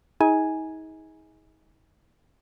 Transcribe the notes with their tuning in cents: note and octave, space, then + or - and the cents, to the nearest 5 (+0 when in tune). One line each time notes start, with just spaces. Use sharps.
D#4 +40 G#4 +5 G#5 +0